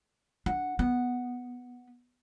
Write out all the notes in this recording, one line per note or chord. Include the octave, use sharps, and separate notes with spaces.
D4 F#5
B3 F#5